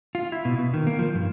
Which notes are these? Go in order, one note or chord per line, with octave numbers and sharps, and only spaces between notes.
F4
E4
B2
B2
D#3
A#3
F3
G2